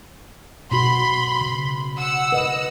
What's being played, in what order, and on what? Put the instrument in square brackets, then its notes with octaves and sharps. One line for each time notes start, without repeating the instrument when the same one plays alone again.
[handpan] B2 F#4 [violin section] B5 C6
[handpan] C#3
[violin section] F#5 E6
[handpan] B4 D#5